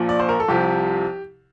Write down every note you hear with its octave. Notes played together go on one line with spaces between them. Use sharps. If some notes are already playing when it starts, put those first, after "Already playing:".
Already playing: A#1 A#2 F3
D5
C5
A#4
A4
C2 C3 F3 G4